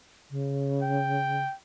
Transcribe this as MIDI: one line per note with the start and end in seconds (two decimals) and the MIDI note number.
0.31 1.45 49
0.83 1.54 79